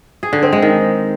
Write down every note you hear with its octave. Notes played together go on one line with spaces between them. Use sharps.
G#4
D3
C4
G#3
D#3